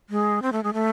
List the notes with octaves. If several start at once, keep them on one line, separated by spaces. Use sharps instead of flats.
G#3
C4
A3
G#3
A3